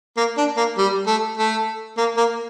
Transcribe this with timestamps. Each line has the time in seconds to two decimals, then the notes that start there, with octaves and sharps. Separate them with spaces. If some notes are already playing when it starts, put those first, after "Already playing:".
0.17 A#3
0.37 D4
0.57 A#3
0.78 G3
1.07 A3
1.37 A3
1.98 A#3
2.17 A#3